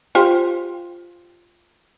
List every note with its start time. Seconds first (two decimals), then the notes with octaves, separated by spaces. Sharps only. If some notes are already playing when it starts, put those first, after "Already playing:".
0.15 F4 G4 C5